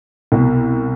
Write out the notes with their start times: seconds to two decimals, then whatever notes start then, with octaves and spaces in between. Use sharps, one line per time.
0.32 C2 B2